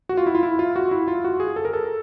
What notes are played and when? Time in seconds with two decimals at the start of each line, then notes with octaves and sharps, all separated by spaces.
0.09 F#4
0.17 F4
0.26 E4
0.35 F4
0.43 E4
0.59 F4
0.76 F#4
0.91 E4
1.08 F4
1.24 F#4
1.40 G#4
1.56 A4
1.65 A#4
1.73 A4